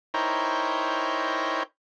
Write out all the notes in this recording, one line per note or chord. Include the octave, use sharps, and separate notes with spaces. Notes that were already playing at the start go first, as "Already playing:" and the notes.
D#4 E4 A#4 C5 C#5 G5